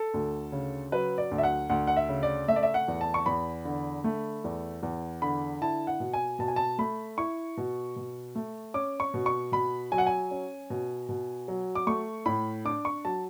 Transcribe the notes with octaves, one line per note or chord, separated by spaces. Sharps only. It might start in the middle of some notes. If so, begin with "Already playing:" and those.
Already playing: A4
D2
C#3
F#3 B4
D5
D2
E5
F#5
D2 F#5
F#5
E5
C#3
D5
A3 E5
D5
E5
F#5
E2
A5
C#6
E2 B5
D3
A3
E2
E2
D3 B5
E4 A5
F#5
B2
G#5
B2 A5
G#5
A5
A3 B5
E4 C#6
B2
B2
A3
C#4 D6
C#6
B2
C#6
B2 B5
F#3 G#5
F#5
G#5
C#4
B2
B2
F#3
D6
A3 C#6
A2 B5
D4 D6
C#6
F#3 A5